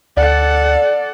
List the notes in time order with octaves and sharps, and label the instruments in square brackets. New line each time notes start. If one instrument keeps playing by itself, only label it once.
[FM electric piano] D2 [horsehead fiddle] A4 F#5 [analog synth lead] D5